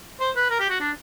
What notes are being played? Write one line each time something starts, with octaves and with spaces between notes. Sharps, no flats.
C5
B4
A#4
G4
F#4
D4